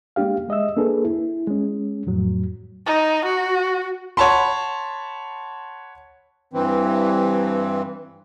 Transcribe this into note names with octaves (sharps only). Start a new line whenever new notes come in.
G#3 A#3 D4 G4 F5
G#3 D#5 E5 E6
A#3 D4 G#4 A4 B4
E4
G#3 C#4
F2 A2 F#3
D#4
F#4
C#5 F#5 A5 B5 C6
G2 E3 C4